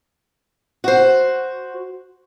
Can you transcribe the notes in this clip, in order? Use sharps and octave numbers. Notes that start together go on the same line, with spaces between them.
F#4 C5